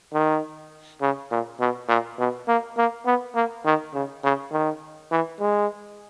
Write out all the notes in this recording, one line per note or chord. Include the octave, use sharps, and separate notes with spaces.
D#3
C#3
A#2
B2
A#2
B2
A#3
A#3
B3
A#3
D#3
C#3
C#3
D#3
E3
G#3